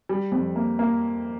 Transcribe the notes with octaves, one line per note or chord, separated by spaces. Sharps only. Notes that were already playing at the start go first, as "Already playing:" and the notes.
G3
F2
A#3
A#3